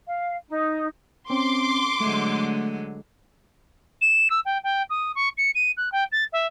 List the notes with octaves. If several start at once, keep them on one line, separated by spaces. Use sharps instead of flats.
F5
D#4
C4 C#4 C6 D6
D3 F#3 G#3 A3
E7
E6
G5
G5
D#6
C#6
C#7
D#7
F#6
G5
A6
E5